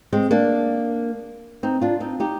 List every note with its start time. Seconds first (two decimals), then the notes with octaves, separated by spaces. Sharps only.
0.13 G#3 C4
0.31 A#3 D4
1.63 C4 D#4
1.81 D4 F4
2.00 C4 D#4
2.20 D#4 G4